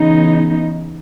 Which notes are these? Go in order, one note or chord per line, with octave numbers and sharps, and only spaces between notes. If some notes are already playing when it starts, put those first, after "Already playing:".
Already playing: C#3 E3 B3 D#4